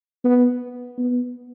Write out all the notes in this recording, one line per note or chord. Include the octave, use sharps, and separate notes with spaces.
B3
B3